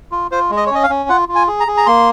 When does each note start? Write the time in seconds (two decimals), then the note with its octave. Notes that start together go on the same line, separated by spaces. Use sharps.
0.12 F4
0.31 F4 C5
0.50 G#3
0.57 D#5
0.67 C#5
0.71 C#4 D#5
0.83 F5
0.90 C#4
1.09 F4 F#5
1.29 F4
1.35 G#5
1.48 G#4
1.60 A#5
1.67 G#4
1.77 A#5
1.86 A#3 C6